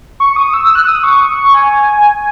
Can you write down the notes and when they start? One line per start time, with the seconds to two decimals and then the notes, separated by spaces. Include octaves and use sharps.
0.20 C#6
0.36 D#6
0.54 E6
0.65 E6
0.75 F#6
0.86 D#6
1.04 C#6
1.54 G#5